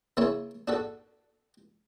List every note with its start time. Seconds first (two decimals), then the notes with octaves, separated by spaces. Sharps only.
0.17 C#3 A#3 C#4 E4 C#5
0.68 D4 F#4 A4